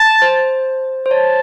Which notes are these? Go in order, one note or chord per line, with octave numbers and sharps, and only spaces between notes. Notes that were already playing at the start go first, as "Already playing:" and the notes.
Already playing: A5
C5
C5
C#5 A5